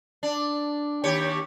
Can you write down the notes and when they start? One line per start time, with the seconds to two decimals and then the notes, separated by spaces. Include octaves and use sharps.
0.23 D4
1.04 D#2 G4 C#5